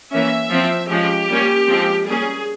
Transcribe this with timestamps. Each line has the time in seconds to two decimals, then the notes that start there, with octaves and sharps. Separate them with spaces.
0.12 E3 A#3 C#4 E5
0.50 F3 C4
0.90 F3 G#3 C#4 G4
1.29 G3 A#3 C#4
1.68 F3 G#3 C4
2.07 G3 A#3 C#4 G#4